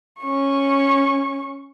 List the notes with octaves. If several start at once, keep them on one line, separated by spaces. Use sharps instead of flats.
C#4 C#6